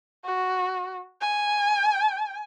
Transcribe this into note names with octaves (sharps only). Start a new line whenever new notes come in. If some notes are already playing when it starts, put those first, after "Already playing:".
F#4
G#5